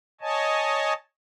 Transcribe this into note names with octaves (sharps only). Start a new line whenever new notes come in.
C#5 D#5 G#5 A5